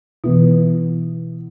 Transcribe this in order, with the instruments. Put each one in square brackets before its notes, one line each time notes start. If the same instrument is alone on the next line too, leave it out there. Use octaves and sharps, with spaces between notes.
[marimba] B2 [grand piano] E3 B3 E4